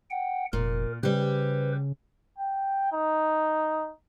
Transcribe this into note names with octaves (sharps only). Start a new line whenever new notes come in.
F#5 G5
F1 A#2 A#4
C#3 G3 G4 B4 C5
G5
D#4